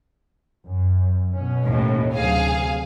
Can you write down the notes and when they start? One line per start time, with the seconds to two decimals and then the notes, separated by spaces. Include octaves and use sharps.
0.65 F#2
1.32 B2 C#4
1.63 D#2 A2
2.15 D2 C3 F#3 G#4 F5